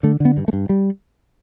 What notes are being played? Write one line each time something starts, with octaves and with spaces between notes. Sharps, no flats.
D3 A3
D3 B3
G2
A3
G2
G3